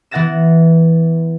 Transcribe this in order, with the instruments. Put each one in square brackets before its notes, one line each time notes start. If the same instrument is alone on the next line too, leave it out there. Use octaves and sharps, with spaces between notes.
[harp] E3 B3 F#5 A6 A#6 E7